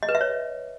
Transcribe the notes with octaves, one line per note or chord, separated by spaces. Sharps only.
D#5
B4
E5
C#5